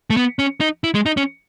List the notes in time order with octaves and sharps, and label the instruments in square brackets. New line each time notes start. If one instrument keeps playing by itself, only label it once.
[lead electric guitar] A3
B3
C#4
D#4
E4
G#3
D#4
C#4